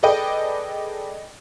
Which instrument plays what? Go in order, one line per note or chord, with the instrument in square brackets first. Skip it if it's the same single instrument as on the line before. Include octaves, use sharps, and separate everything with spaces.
[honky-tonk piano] G#4 A4 B4 D5 D#5 G5